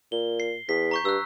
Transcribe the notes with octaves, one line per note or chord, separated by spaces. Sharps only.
A#2 G7
C7
E2 B6
A#5 C#6 G6
G2 E6 F#6